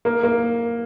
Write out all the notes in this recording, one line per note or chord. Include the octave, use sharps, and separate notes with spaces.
A#3
A#3